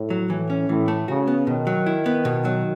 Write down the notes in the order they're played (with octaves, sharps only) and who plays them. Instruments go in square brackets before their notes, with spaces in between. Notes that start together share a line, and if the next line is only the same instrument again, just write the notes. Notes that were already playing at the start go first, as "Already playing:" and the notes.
Already playing: [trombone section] A2
[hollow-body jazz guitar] F#3
[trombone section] A2 [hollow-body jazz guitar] E3
[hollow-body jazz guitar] C#4
[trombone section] A2 [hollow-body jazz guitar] E3
[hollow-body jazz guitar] A3
[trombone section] C#3 [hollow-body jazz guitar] F#4
[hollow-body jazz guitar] B3
[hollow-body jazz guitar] B2 [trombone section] D#3
[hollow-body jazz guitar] F#3
E4
B3
B2
F#3